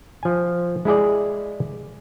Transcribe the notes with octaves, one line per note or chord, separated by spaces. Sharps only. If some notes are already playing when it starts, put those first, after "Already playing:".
F3 G#5
G#3 E4 G#4 D5